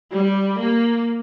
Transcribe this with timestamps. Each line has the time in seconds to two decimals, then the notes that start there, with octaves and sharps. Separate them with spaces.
0.11 G3
0.59 A#3